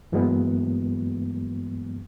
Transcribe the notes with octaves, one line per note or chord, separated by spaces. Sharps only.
G2 E3 F#3 G#3 A#3 B3